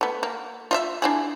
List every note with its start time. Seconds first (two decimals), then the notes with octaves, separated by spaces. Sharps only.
0.01 A3 B3
0.23 A#3
0.71 F4 D#5 E5
1.02 D4 E4 G#4